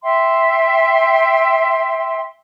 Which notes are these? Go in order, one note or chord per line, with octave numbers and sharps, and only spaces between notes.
E5 G5 C6